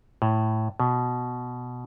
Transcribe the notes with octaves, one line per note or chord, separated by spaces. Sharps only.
A2
B2